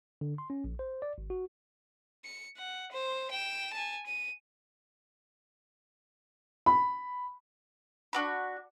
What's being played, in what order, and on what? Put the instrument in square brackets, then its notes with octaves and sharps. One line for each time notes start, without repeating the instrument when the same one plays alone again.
[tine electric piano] D3
C6
C#4
A#1
C5
D5
G#1
F#4
[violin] C#7
F#5
C5
G5 E7
G#5 A5
D#7
[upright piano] B5
[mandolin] D4 F#4 B5